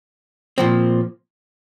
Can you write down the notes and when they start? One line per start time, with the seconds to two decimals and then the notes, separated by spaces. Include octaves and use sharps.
0.58 A#2 F3 C4